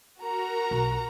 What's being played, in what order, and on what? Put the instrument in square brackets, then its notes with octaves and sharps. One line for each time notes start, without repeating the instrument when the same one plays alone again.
[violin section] F#4 A#4 A#5
[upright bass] B1